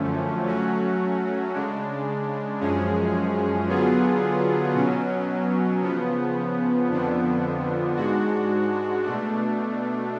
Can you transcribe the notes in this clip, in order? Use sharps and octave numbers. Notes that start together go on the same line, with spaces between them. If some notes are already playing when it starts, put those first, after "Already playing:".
Already playing: F#2 D3 F3 A3 C#4
F#3 A3 C#4 F#4
C#3 G#3 D4
F#2 F3 G#3 C#4 G#4
D3 F#3 B3 F4 G#4
B2 F#3 C#4
C#3 F3 B3
F2 D3 F3 B3 D4
G#2 G#3 D4 F#4
B2 A3 D4